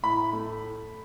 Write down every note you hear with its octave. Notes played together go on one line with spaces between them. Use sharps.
A2 B5
A3